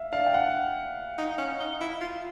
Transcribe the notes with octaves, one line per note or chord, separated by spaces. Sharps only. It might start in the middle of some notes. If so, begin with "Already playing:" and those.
Already playing: E5 F5
D4 F5
G5
F#5
D#4
C#4
D#4
E4
F4